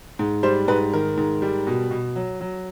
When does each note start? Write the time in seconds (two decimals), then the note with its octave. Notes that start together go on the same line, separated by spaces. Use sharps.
0.19 G#2
0.43 G3 C5
0.68 G#2 B4
0.93 D#3 A#4
1.17 G#2
1.42 G3
1.67 B2
1.91 B2
2.16 F#3
2.41 F#3